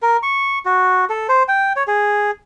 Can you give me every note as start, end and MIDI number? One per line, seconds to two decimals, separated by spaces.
0.02 0.17 70
0.23 0.59 85
0.65 1.05 66
1.09 1.27 69
1.29 1.43 72
1.48 1.73 79
1.76 1.83 73
1.87 2.31 68